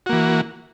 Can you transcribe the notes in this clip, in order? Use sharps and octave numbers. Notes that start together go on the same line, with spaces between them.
E3 A#3 F#4